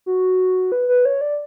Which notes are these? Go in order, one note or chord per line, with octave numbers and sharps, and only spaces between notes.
F#4
B4
B4
C#5
D5